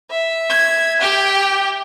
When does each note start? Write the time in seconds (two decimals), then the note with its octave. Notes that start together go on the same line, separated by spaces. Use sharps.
0.10 E5
0.50 G#6
1.01 G4 G5